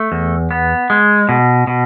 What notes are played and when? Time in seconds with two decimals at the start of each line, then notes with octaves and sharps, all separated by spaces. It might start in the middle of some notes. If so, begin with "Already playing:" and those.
Already playing: A3
0.12 E2
0.51 B3
0.90 G#3
1.29 B2
1.67 B2